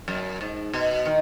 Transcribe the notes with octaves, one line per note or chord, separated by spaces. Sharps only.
F#2
G#2
B2
D#3